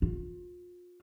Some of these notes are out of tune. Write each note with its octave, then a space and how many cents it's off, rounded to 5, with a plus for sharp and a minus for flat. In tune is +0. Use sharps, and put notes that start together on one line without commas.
F4 +30